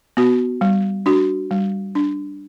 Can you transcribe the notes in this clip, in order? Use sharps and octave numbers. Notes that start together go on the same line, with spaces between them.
B3 F#4
G3
D4 F#4
G3
D4